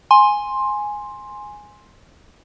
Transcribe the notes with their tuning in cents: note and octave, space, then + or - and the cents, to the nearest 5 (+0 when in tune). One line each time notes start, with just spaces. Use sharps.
G#5 +0 C6 +10